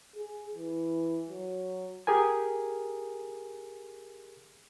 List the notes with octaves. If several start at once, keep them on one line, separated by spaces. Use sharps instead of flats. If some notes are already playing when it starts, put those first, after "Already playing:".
G#4
E3
F#3
G4 G#4 A#4 G#5